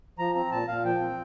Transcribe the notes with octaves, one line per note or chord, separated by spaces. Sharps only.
F3 A#5
C4 A#5
A#2 A5
A#2 F5
F3 G5
C4